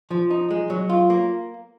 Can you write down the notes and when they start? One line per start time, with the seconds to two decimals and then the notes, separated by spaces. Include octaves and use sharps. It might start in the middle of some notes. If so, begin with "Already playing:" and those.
0.11 F3
0.30 D#4
0.51 G#3
0.70 F#3
0.90 F4
1.10 A#3